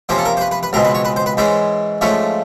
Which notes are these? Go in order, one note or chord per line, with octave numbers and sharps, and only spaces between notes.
C3 F3 A#3 C#4 C5
A4
A#4
C5
B4
B4
B4
C#2 B2 G#3 C4 A#4
B4
C#5
B4
C5
B4
G#2 E3 G#3 C#4 C5
G#2 F3 A3 C#4 C#5